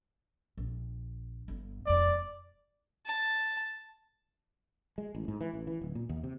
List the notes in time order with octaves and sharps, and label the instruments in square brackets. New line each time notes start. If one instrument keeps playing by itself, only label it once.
[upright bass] A#1
G1
[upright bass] E1 F2 [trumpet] D5
[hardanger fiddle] A5
[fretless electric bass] G#3
A1
G#2
E3
A1
E3
D1
A#2
D#2
C3